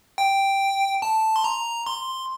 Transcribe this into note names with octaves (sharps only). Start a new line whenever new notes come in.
G5
A5
C6
A#5
C6